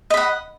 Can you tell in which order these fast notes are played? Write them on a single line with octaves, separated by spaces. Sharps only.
D#5 B5 F#5